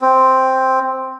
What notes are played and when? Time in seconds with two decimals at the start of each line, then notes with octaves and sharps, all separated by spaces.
0.01 C4